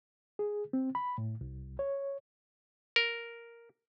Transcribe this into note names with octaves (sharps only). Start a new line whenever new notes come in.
G#4
C4
B5
A2
C2
C#5
A#4